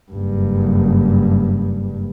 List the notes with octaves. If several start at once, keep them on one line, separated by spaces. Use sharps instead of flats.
F#1 G2